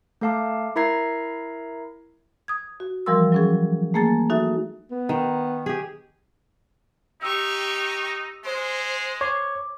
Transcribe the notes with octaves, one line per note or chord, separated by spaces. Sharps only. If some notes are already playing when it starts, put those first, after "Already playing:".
A3 A4 F5 A5 D6
E4 A#4 E5 A#5 G#6 C7
D#6 G#6
F#4
E3 F3 G3 A#4 C6 E6
F#3 C#4 G#4
A3 A#3 G#4 G#5 A6
D#4 F#4 A4 E5
B3
D#3
G4 G#4
D#4 G4 C#6 E6
G#3 C5
C#5 D6